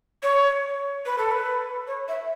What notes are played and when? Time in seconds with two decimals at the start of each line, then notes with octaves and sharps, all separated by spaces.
0.23 C#5
1.05 B4
1.18 A4
1.31 B4
1.87 C#5
2.08 E5